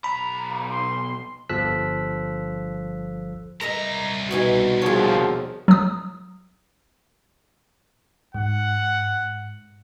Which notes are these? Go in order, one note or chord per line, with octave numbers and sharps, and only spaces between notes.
B1 A#5 B5
C6
G1 F3 A4 E6 F#6 B6
C2 A#4 D#5 E5 A#5
B2 D#4 F#4 G#5
D#2 D3 F3 G#4 C#5
F#3 D#6
G#2 F#5